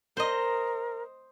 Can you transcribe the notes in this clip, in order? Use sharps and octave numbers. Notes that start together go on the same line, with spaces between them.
A#4 C5 D#5